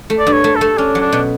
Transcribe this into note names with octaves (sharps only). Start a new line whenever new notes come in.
A3
D5
G2
C#5
A3
A4
A3
C#4 D4
F#3
D4
B2